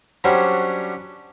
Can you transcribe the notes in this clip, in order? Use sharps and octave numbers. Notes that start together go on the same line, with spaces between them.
F#3 G3 C#4 D4 F#4 C5